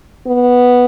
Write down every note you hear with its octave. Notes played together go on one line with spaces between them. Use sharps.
B3